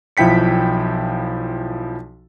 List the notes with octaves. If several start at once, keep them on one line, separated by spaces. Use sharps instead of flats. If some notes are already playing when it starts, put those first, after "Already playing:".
B1 F3 E4 G5 B6 C#7